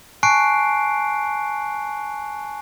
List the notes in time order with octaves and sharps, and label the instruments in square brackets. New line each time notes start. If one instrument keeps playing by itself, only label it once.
[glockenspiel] G#5 A5 C#6 F#6 C7 D7